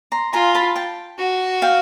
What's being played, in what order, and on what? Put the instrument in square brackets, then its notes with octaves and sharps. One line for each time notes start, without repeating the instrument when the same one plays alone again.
[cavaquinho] A#5 C6
[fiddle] F4 [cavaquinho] G#5 A#5
[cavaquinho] A5 B5
G5 A5
[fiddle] F#4
[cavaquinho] F5 G5